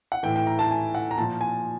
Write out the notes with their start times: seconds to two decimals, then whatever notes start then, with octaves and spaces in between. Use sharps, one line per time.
0.12 F#5
0.23 A2 E3 G5
0.36 G5
0.47 A#5
0.59 A5
0.71 G#5
0.95 F#5
1.11 A#5
1.18 A#2 F3 A5
1.41 G#5